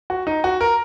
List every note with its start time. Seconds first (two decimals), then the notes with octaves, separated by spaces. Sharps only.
0.10 F#4
0.27 D#4
0.44 F#4
0.61 A#4